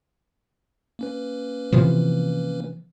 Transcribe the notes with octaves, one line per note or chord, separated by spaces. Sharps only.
A#3 C#4 B4
C3 E3 F3